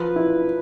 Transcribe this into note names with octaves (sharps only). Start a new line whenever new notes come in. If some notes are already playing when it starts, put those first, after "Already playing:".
Already playing: F3 B4
E4